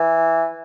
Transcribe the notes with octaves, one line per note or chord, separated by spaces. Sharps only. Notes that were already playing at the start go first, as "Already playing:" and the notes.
Already playing: E3